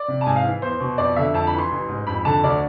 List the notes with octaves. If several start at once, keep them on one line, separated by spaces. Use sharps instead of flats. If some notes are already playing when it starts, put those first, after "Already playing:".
Already playing: D5
C3
A5
G#2 G#5
F5
E3
E2 C5
B2
F2 D5
D3 E5
F2 A5
B5
E3
C6
A1
G#2
F2 B5
D3 A5
D2 D5